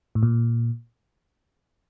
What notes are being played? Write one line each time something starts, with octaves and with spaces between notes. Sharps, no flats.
A2
A#2